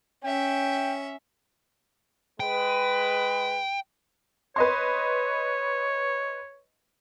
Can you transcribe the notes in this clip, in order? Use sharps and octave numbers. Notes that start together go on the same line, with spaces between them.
C#4 E5 G5
G#3 B4 G5
B4 C#5 D#5 C6